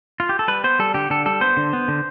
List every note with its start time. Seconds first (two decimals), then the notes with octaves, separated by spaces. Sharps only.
0.20 F4
0.29 G4
0.39 A4
0.48 G3 B4
0.64 B3 C5
0.79 G3 A4
0.94 D3 G4
1.10 D3 A4
1.26 G3 A4
1.41 B3 C5
1.57 D3
1.73 B3
1.88 D3